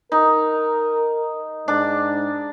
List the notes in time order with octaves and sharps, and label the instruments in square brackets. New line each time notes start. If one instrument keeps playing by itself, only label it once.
[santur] D#4 [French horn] A#4
[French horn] G#2 [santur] D4